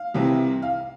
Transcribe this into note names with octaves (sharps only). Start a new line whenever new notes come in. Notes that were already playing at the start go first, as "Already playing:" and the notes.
Already playing: F5
C2 C3 E3
F5